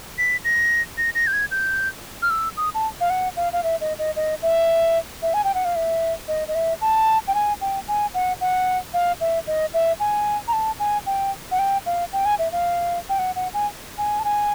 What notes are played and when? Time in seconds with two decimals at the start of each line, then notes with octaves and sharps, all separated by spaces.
0.18 B6
0.44 A#6
0.98 A#6
1.15 A#6
1.27 G6
1.33 G#6
1.51 G6
2.22 F6
2.30 E6
2.57 D#6
2.74 A5
3.01 F5
3.10 F#5
3.36 F5
3.53 F5
3.63 E5
3.81 D#5
3.98 D#5
4.16 D#5
4.42 E5
5.22 E5
5.34 G#5
5.44 G5
5.54 F#5
5.65 F5
5.76 E5
6.28 D#5
6.48 D#5
6.55 E5
6.81 A5
7.28 G5
7.34 G#5
7.61 G5
7.88 G#5
8.14 F#5
8.41 F#5
8.94 F5
9.20 E5
9.47 D#5
9.74 E5
10.00 G#5
10.48 A#5
10.53 A5
10.79 G#5
11.06 G5
11.51 F#5
11.59 G5
11.86 F5
12.13 G5
12.25 G#5
12.39 E5
12.52 F5
13.09 G5
13.19 F#5
13.36 F#5
13.54 G#5
13.98 G#5
14.19 A5
14.24 G#5